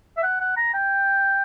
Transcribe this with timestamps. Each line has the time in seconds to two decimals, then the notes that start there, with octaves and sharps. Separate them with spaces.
0.17 E5
0.23 F#5
0.40 F#5
0.57 A#5
0.74 G5